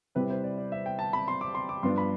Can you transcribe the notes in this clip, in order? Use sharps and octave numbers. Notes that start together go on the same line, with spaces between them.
C3 G3 C4 E4 B4
C5
D5
D5
E5
G5
A5
B5
C6
D6
C6
D6
G2 F3 B3 D4 C6
B5